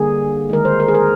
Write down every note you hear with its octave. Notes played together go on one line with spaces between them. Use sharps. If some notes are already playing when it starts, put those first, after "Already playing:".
Already playing: D3 G3 A#3 G#4
D#3 G#3 A#4
C5
A#4
G#4
A#4